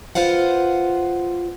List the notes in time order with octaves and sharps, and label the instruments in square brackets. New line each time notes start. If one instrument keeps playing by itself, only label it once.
[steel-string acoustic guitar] F4 B4 C5 F5 F#5